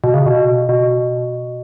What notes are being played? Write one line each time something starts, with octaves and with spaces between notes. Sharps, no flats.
B2
C#3
B2
B2